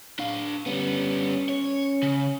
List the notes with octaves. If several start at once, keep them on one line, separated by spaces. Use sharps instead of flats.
D4 F5
G3 B3 C#4
C#5
C#3